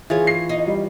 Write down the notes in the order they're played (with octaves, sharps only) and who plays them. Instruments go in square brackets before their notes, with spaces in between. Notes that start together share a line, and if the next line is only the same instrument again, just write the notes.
[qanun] E3 F4 C#5 [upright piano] G#4
[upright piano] C7
[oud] D#4
[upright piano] G3